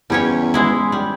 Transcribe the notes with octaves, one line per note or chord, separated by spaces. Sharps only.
E2 G3 C#4 C#5
G#3 E4
G3